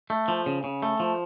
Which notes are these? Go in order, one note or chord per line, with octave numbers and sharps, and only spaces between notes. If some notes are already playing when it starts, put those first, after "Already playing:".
A3
F3
C#3
C#3
A3
F3